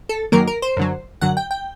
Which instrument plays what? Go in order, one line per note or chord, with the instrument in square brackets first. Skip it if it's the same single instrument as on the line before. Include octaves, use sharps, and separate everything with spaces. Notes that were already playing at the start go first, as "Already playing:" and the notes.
[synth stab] A4
F#2 D#3 F#3 A#3 A#4
A#4
C5
F#2 D3 F#3
F#2 D3 F#3 F#5
G5
G5